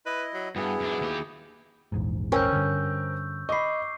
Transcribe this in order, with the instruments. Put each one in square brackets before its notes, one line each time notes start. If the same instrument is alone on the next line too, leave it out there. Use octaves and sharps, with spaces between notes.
[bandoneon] E4 D#5 [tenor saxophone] B4
[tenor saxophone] F#3
[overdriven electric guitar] G2 [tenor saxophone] B3 [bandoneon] E4 [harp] F#4 G#4
[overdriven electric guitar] F#2 D4
D#2 G4
[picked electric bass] A#1 E2 G#2
[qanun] C#4 [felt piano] A#4 C5 G5 [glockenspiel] C#6 E6 G6
[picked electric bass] G2 D3 [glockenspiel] G6
[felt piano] D#5 B5 [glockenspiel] C#6 D6 C7